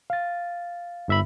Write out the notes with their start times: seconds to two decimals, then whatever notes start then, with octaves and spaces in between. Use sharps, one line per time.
0.10 F5 A6
1.08 G1 E5 B5